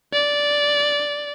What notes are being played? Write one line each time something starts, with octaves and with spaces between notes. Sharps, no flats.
D5